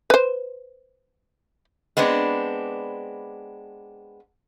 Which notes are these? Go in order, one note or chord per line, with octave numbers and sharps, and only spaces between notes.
B4 C5
G#3 B3 C4 D4